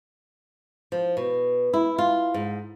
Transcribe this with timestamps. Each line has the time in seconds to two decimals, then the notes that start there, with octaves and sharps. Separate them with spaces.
0.92 F3
1.17 B2
1.73 E4
1.98 F4
2.34 G#2